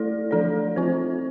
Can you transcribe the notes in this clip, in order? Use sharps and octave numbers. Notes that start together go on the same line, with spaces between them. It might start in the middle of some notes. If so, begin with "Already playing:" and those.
Already playing: A3 E4 A4 D5
F3 A3 D4 A4 D5
F3 C4 F4 C5